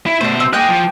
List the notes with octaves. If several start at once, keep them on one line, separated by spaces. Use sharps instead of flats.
E4
B2 A3 D4 C5
C4
A#3 G#4 D#5 G5 F#6
F3